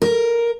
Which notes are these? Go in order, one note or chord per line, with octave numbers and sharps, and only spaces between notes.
A#4